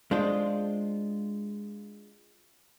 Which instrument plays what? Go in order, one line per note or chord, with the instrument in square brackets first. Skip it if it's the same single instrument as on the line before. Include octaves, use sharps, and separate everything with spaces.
[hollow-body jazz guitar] G#3 D4 F4 C5